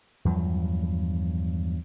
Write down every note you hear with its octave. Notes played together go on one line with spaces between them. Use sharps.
E2 G2 F3 F#3